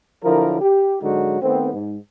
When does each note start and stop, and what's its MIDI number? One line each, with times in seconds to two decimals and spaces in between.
0.24 0.59 50
0.24 0.59 53
0.24 0.59 54
0.24 0.59 64
0.24 0.59 70
0.61 0.96 67
1.02 1.40 44
1.02 1.40 50
1.02 1.40 54
1.02 1.40 56
1.02 1.40 63
1.02 1.40 66
1.42 1.72 51
1.42 1.72 57
1.42 1.72 59
1.42 1.72 60
1.73 1.97 44